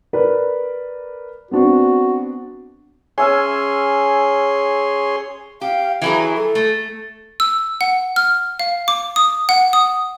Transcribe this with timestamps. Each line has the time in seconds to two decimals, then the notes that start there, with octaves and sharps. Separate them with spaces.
0.13 A#4 B4 D5
1.51 B3 C4 D4 F#4
3.18 C#4 G#4 C#5 E5 G#5 C6
5.61 G4 F5
6.02 E3 F#3 G#4 E5
6.36 A4
6.55 A3
7.40 E6
7.81 F#5
8.16 F6
8.60 F5
8.88 D6
9.16 D#6
9.49 F#5
9.73 D#6